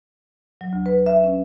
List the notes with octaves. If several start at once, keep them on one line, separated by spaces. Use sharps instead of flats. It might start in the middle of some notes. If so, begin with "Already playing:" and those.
F#3
D2
B4
E5
C#4